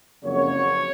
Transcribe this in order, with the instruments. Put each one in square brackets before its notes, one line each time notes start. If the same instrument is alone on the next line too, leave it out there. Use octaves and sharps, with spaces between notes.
[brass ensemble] F#1 F2 C#3 F#3 A#3 C#5